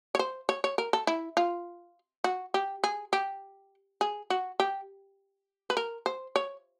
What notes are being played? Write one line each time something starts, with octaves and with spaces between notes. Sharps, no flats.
C#5
C5
C#5
C#5
A#4
A4
E4
F4
F#4
G4
G#4
G4
G#4
F#4
G4
B4
A#4
C5
C#5